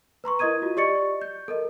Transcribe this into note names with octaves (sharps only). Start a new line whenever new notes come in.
B4 A#5 C6 C#6
E4 A#4 D#5 D#6 G#6 D#7
F4 F#4
G4 D5 D#5 C#6 A6 C#7
G6
A4 A#4 D#5